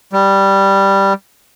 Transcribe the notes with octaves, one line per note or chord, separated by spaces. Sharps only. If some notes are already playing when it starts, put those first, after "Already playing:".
G3